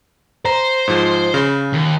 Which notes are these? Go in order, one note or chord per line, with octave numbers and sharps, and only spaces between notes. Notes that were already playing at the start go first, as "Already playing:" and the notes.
C5 A#5
G#2 F3
C#3
D#2